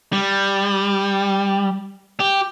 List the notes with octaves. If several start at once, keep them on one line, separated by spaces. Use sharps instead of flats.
G3
G4